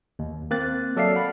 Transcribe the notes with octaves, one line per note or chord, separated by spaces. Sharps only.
D#2
A#3 C4 F#6 A6
F#3 A4 D5 E5 F5 C7
F5 F#5 B5